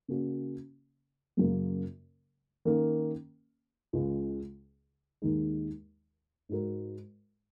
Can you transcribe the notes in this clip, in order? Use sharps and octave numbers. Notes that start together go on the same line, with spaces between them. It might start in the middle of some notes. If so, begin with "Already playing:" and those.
C#3 A#3 C#4 F#4
F#2 C#3 F#3 A#3
D#3 A#3 C#4 A#4
C#2 C#3 G#3
D#2 D#3 G#3 D#4
G#2 G#3 F#4 A#4